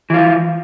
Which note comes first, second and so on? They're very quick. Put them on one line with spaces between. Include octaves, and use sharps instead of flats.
E3 F4 F3